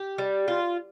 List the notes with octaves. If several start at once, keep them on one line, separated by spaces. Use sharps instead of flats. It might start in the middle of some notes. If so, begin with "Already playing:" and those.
Already playing: G4
G3
F4